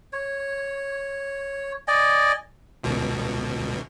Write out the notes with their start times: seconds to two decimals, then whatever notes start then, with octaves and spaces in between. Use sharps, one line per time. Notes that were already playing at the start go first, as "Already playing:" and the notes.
0.13 C#5
1.88 D5 D#5 G#5
2.84 G1 C#2 B2